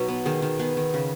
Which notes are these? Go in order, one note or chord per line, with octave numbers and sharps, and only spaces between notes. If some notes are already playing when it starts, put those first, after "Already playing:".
Already playing: B2 F#3 D#4
B3
D#3 G#4
D#3
B3 G#4
D#3
C#3